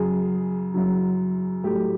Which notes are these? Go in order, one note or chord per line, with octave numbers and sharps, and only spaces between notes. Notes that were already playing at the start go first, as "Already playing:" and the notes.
Already playing: F#2 C#3 F#3 G#4
F#2 C#3 F#3
A2 F#3 A3 G4